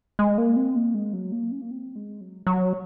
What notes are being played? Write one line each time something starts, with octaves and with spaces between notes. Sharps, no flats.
G#3
A#3
C4
A#3
G#3
F#3
A#3
C#4
A#3
C4
G#3
F#3
F#3